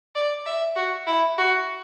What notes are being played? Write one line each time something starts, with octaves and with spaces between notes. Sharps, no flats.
D5
E5
F#4
E4
F#4